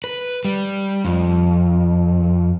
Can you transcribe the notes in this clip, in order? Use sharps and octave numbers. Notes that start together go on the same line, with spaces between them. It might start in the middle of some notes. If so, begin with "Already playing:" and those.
B4
G3
F2